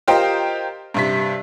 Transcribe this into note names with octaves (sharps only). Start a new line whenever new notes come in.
F4 G4 A#4 C5 D#5 G5
G2 C3 B6